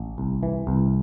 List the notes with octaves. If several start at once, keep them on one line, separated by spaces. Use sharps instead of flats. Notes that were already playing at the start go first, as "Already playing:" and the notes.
Already playing: A1
C2
E3
C2